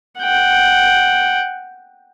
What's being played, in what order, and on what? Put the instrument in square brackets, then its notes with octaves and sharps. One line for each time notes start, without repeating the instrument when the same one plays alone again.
[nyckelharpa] F#5 G5